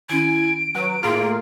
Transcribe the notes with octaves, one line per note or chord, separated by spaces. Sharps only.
D#3 C#4 E4 G#5 D7
F#3 B4
A2 A#3 F4 G#4